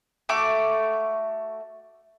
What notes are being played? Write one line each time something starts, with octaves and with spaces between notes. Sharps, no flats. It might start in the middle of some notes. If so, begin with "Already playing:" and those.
A3 F#4 D6